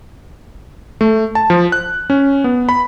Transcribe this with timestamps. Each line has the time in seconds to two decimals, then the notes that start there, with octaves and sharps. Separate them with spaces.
1.01 A3
1.35 A5
1.50 F3
1.72 F#6
2.10 C#4
2.44 B3
2.69 B5